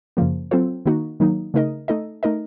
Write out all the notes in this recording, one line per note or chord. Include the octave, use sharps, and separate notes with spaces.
F#2 C#3 F3 A#3
F#3 C4 F4 A4 C5
D#3 A#3 D#4 F#4
D#3 F#3 A#3 D#4
C#3 A3 D#4 A#4 D#5
A3 D#4 A4 D#5
A3 D#4 A#4 D#5